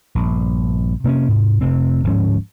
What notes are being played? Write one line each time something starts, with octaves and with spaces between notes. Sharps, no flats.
A#1 G2
C3 A#3 C4 C#4
G#2 C3
F1 C3 A3 C4
D1 G#2 F3 C#4